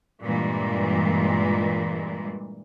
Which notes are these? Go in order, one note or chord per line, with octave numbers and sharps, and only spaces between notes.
G2 A#2 E3 G3 G#3